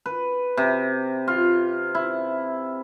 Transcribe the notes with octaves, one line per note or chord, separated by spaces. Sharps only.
B4
C3
F4
E4